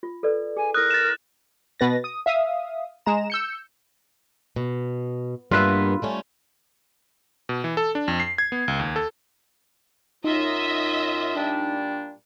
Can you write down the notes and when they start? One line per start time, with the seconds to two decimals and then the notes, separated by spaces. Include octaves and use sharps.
0.03 F4
0.23 A4 B4 D5
0.57 G#4 G#5
0.74 E4 A#4 D#6 F#6
0.91 A6 E7
1.80 B2 B4 A6 A#6
2.04 D#6
2.26 E5 F5 D#6
3.06 G#3 A#5 E7
3.30 E6 G6 C#7
4.56 B2
5.51 G2 A#3 B3 F4 B4 E5
6.02 G3 A3 C#4
7.49 B2
7.64 E3
7.77 A4
7.95 D4
8.08 F2
8.20 C7
8.38 G#6
8.52 B3
8.68 C#2
8.80 D#2
8.96 A4
10.24 F#2 D#4 F4 D#5 E5
11.35 A#2 G3 D4